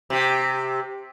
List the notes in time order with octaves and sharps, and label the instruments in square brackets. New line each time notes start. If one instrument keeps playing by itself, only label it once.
[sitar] C3 G4